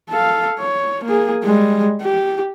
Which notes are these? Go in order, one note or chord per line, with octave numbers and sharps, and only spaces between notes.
A4 F5
C#5
A#3 G#4
G3 G#3
G4